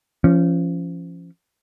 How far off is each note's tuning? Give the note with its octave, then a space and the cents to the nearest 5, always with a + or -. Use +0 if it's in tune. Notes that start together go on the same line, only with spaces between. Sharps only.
F3 -30 C#4 +0